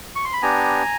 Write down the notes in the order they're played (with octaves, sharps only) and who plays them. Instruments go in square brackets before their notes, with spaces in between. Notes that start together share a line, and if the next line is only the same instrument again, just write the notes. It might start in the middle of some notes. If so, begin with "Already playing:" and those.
[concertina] C#6
C6
B5
B3 D4 G4 G#5 A#5